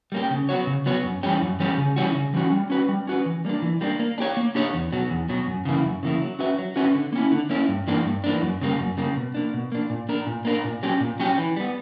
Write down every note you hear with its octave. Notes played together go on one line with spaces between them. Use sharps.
G3 A#3 C#4 G4
C#3
F#3 B3 F#4 C#5
C#3
F#3 B3 F#4 C#5
F#2
E3 G3 C#4 G4
F#2
E3 G3 C#4 G4
C#3
E3 G3 C#4 F#4
C#3
E3 G3 C#4 F#4
G3
C#4 F#4 B4
G3
C#4 F#4 B4
E3
G3 A#3 D4
E3
G3 A#3 D4
A#3
D4 G4 C#5
A#3
D4 G4 C#5
E2
B2 F#3
E2
B2 F#3
F#2
C#3 E3 A#3 E4
F#2
C#3 E3 A#3 E4
F#3
C#4 F#4 B4 E5
F#3
C#4 F#4 B4 E5
D3
A#3 C#4 E4
D3
A#3 C#4 E4
G2
E3 A#3 D4
G2
E3 A#3 D4
F#2
C#3 G3 A#3
F#2
C#3 G3 A#3
B2
A#3 D4
B2
A#3 D4
A#2
A#3 D4 A#4
A#2
A#3 D4 A#4
A#2
F#3 C#4 G4
A#2
F#3 C#4 G4
E3
G3 B3